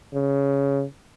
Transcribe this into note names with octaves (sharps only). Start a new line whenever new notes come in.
C#3